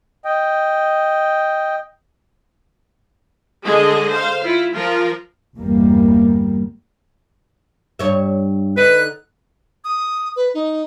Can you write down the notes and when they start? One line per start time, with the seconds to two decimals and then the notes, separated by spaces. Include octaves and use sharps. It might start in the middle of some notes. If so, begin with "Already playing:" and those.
0.25 D#5 G5
3.65 D3 G#3 G#4 D#5
4.12 C5 F5
4.44 E4 F4
4.74 F3 F4 A#4
5.58 G1 E2 G2 G3 A#3
7.99 G2 C#5 E5
8.77 D3 D#4 B4 F#6
9.84 D#6
10.36 B4
10.54 D#4